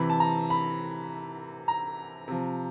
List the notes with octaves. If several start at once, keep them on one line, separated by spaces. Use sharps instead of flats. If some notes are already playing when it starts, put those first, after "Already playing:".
Already playing: C3 E3 B5
A5
A#5
B5
A#5
C3 F3